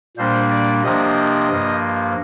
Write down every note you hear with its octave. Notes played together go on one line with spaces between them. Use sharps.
A#2 G3 A#3 D4 C5
D5
C3 F3 A#3 D4 D#5
G2 F3 A#3